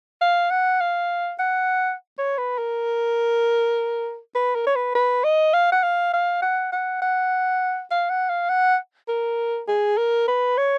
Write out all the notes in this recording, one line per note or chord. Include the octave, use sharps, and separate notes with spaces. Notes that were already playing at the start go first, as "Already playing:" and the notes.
F5
F#5
F5
F#5
C#5
B4
A#4
B4
A#4
C#5
B4
B4
D#5
F5
F#5
F5
F5
F#5
F#5
F#5
F5
F#5
F5
F#5
A#4
G#4
A#4
B4
C#5